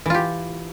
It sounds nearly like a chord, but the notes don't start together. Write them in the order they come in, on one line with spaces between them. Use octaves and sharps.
E3 F4 G4